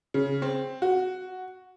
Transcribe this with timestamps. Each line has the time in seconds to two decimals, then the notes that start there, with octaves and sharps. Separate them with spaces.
0.14 C#3
0.42 C4
0.82 F#4